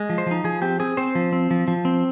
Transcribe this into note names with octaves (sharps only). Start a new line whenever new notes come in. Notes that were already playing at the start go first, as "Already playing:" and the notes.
Already playing: G#3
F3
C5
F3 D#4
F3 G#4
C4 G4
C4 G#4
C4 C5
F3
C4
F3
F3
C4